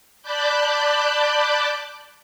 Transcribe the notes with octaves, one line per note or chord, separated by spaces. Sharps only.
D5 A5 B5 D6 F#6 G6